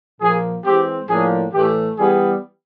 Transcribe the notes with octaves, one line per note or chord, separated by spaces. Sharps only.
A#2 F3 A#3 G#4
E3 G#3 C4 G4
A2 F3 A#3 D4 G#4
A2 E3 A3 G4
E3 G3 B3 G#4